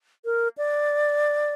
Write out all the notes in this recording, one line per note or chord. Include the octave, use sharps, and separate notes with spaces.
A#4
D5